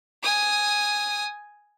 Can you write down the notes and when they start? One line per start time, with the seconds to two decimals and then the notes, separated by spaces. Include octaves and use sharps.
0.23 G#5 D#6